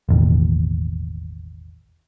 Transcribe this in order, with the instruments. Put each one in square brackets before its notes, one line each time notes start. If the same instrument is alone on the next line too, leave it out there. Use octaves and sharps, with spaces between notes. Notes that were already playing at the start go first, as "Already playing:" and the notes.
[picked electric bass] E1 A1 D#2